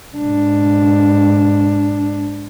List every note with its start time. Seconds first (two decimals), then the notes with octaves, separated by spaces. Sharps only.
0.18 G#2 D4